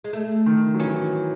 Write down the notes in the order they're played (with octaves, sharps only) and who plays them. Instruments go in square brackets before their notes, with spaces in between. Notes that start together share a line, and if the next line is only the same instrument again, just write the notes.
[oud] G#3
A3
[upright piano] D#3
F#3
[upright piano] E3 [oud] C#4